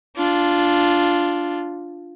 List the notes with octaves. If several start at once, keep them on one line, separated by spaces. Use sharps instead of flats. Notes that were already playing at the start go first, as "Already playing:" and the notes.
D4 F4